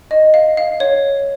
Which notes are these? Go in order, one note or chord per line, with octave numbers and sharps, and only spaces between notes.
D#5
F5
F5
C#5